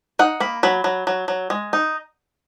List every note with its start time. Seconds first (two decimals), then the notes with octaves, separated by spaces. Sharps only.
0.19 D#4 F#5
0.40 A#3 B5
0.63 F#3 B5
0.84 F#3
1.07 F#3
1.28 F#3
1.50 G#3
1.73 D#4